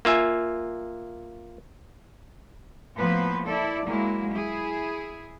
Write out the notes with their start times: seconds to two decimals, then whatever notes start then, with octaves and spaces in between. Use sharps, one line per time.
0.05 A#3 F4 E5 G#5
2.97 A2 F3 A#3 B3 B4 C5
3.46 E4 A4 D5
3.85 F#3 G#3 A#3 E4
4.31 E4 G#4